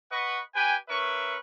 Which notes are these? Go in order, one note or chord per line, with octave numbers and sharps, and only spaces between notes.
B4 D#5 F#5 B5 C#6
G4 B4 G5 G#5
C#4 A#4 B4 E5 C#6